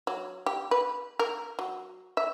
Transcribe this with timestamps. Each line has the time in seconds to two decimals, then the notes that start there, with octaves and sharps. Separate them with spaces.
0.07 F#3
0.46 G4
0.71 B4
1.19 A#4
1.59 F#3
2.17 E5